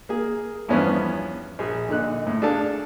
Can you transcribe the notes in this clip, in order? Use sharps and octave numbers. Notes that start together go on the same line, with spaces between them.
A#3 G#4
E2 G2 E3 F3 B3 C#4
A#1 G#4
A#2 D3 D#4 F#6
A2
D4 G#4 A4 F5 A5